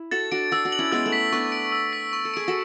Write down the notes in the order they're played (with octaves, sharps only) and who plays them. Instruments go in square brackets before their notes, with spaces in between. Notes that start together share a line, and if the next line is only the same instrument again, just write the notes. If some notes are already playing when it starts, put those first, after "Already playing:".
Already playing: [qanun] E4
[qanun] F#4 A4 [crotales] A6
[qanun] D4 F#4 [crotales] D7
[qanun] D4 F#4 [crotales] E6
[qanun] D4 F#4
[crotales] F#7
[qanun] C#4 E4
[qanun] G#3 B3 [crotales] E6
[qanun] A3
[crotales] B6
[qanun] B3 D4 [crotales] C#6
[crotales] D7
E6
B6
C#6
[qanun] A4
[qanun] G#4 [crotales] D7
[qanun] F#4 A4